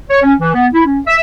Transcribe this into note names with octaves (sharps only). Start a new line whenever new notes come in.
C#5
C#4
E3
B3
E4
C#4
E5